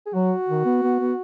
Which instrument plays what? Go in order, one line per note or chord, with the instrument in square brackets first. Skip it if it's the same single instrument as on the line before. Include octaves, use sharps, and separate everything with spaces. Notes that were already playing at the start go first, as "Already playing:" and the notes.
[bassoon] G#4
[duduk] F#3 [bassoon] F#4
[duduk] D#3
B3
B3
B3